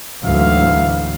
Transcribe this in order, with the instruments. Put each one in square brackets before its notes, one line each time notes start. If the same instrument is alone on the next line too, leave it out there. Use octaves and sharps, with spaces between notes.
[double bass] D2 [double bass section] G#2 E3 F#3 [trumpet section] E4 E5 F5